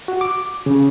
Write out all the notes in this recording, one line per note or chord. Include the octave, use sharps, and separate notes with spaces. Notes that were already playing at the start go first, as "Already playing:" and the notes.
F#4
D6
C#3